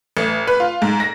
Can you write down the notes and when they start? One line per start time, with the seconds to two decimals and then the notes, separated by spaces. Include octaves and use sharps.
0.17 A1
0.47 B4
0.60 F4
0.82 G#2
1.00 A#6